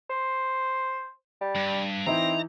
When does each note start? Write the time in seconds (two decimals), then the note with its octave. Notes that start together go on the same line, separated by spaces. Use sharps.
0.10 C5
1.41 G3
1.55 G2
2.07 E3 C4 D#4 E4 A#5